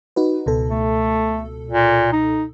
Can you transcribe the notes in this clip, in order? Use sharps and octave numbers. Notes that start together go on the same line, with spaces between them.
D#4 F#4 B4
C#2 B2 A4
A3
A#2
D#4